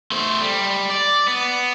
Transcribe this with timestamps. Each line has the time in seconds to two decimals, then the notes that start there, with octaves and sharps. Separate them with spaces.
0.12 A3 C5
0.41 G3
0.90 D5
1.28 B3